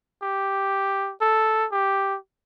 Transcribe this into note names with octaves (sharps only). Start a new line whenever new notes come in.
G4
A4
G4